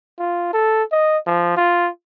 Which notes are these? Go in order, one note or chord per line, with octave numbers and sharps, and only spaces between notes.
F4
A4
D#5
F3
F4